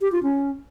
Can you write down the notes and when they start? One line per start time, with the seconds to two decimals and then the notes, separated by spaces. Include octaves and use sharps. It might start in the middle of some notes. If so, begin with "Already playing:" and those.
0.01 G4
0.12 F4
0.23 C#4